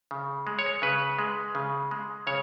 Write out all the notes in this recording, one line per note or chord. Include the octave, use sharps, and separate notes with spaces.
C#3
G#3
C#5
C#3 B4
G#3
C#3
G#3
C#3 C#5